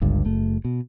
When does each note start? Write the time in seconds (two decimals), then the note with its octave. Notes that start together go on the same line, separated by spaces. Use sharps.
0.02 G1 C#2 G2
0.25 F#1 A3
0.65 B2